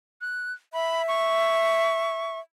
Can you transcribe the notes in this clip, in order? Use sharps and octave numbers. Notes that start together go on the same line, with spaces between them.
F#6
E5 B5
C#6